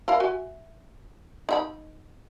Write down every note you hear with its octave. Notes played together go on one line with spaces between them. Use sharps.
E4 A#4 F5
F#4 E5 G#5
D#4 E5 B5